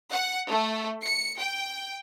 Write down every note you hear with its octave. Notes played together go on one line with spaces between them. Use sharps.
F#5
A3
C#7
G5